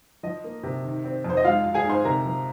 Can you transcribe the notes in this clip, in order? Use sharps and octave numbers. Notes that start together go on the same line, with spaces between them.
F3 D#5
A#3
C3
D#3
C4
F2
C5
D#5
G#3 F4 F5
F4
G#4 G#5
G#2
C5 C6
C3 A#4 A#5
F3